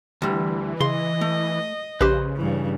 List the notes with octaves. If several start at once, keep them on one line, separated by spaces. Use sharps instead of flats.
D2 E3 G3
C#3 D#5 C6
A3
A#1 C#3 G4 B4 C5
G2 E3